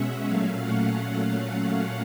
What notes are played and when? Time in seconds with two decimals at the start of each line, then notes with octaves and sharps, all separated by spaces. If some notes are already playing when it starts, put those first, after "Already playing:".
Already playing: B2 G#3 C#4 E5 F#5
0.26 A#2 F#3 A3 C#4 F5
0.61 F#5